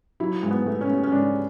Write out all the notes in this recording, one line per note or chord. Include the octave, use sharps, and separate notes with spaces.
F#3 E4
G#2
B3
A3
C#4
A3
C#4
G#2 D4